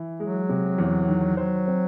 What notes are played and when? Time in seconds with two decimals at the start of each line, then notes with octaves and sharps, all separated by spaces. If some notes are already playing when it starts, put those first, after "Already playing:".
Already playing: E3
0.20 F#3 G#3
0.49 C3
0.78 E2
1.08 D#3
1.37 F#3 C5
1.68 C4